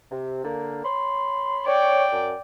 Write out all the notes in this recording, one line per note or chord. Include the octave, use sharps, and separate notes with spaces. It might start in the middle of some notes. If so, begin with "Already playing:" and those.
C3
D3 A#3
C#5 B5 C6
C#5 D5 G5
F#2